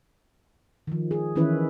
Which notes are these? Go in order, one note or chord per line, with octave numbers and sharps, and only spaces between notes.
D#3 F3
G#4
D#3 E3 C#4 E4 B4